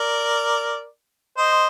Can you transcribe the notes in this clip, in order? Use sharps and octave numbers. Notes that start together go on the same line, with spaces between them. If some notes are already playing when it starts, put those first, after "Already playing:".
Already playing: A#4 D5
C5 D#5